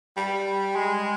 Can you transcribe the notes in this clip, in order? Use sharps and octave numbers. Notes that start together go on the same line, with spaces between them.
G3
G#3